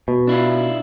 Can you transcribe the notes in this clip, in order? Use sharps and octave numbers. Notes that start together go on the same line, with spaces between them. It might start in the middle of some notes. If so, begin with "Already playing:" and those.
B2
D4 E4 F4